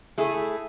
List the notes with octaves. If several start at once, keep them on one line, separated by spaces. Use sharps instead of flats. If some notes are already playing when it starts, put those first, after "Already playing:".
A3 E4 G#4